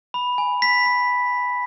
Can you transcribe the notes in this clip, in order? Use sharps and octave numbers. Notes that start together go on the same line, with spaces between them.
B5
G#5
B5 B6
B5